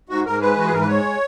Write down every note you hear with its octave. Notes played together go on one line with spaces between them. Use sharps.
G#2 F#4
G#2 A#4
G#3 B4
E3 F#4
G#4
G#2 A#4
B4
G#3 C#5